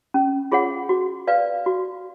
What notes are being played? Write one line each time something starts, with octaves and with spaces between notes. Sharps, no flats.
C#4
F4 G#4 C#5 F#5
F#4
B4 D5 F5
F#4